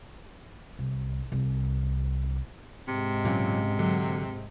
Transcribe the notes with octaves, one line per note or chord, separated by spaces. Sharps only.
C2
C2
G#2 C3 G#3
A#2 C#3 F#3
D3 F#3